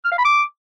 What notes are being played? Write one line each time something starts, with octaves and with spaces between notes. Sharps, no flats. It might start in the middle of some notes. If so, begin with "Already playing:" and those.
F6
F5
B5
D6